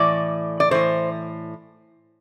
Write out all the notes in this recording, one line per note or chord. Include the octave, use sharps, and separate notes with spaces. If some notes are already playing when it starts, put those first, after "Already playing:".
Already playing: A2 E3 D5
D5
A2 E3 C5